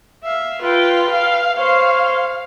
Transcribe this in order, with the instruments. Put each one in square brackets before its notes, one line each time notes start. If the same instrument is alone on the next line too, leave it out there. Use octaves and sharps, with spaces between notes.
[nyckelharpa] E5 F5
[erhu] F4 [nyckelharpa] B4 G5
[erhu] F5
[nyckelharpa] C5 C#5 [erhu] F5